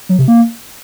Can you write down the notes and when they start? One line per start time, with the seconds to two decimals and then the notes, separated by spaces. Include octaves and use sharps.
0.09 F#3
0.19 C3
0.28 A#3